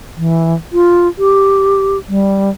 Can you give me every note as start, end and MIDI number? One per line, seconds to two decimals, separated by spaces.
0.17 0.54 52
0.73 1.08 65
1.18 1.98 67
2.09 2.50 55